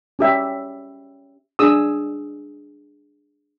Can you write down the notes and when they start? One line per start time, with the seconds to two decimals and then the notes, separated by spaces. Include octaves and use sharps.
0.19 C#4 G4 E5
1.59 D4 G#4 D#6 E6